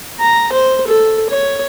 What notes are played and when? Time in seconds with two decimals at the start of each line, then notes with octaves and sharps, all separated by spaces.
0.20 A#5
0.52 C5
0.87 A4
1.30 C#5